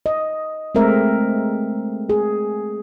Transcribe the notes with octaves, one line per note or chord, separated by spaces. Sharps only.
D#5
G#3 A3 C4 A#4 E5
G#4